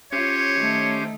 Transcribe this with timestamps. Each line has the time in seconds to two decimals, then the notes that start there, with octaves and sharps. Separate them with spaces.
0.13 C#4 F4 G4 C5 C#5
0.56 D#3 A3